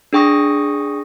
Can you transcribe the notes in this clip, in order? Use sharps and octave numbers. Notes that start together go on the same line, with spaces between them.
D4 G#4 G5 C#6 D#6 A#6